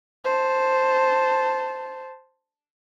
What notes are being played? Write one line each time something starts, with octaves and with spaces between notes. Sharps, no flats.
C5 A5